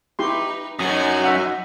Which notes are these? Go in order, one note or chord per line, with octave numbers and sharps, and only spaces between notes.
D#4 E4 G4 B4 C6
F#2 F#3 D#4 F#4 G#5 D#6
E5 F#5